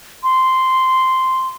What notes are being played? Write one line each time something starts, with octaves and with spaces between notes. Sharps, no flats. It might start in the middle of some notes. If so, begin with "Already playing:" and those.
C6